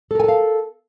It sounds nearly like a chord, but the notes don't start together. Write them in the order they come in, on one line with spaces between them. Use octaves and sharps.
A4 A#4 G#5 A5 F5